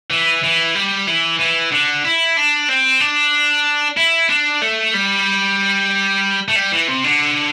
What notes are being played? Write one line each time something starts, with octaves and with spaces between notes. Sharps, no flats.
E3
E3
G3
E3
E3
D3
E4
D4
C4
D4
E4
D4
A3
G3
A3
G3
E3
C3
D3